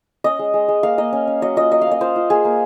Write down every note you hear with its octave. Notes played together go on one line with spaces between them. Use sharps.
C#4 D#5
G#3
G#3
G#3
A#3 F5
A#3 D#5
C#4
C#4
F#3 D#5
F4 D#5
F#3 D#5
F5
A#3 D#5
F4 C5
F4
A#3 G#4
A#3